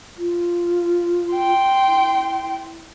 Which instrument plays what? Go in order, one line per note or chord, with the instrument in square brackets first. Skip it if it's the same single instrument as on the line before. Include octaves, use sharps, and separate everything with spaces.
[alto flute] F4
[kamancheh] G5 C6
[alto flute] E4